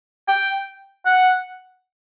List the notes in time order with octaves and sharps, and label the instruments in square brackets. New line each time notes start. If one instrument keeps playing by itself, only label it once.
[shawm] G5
F#5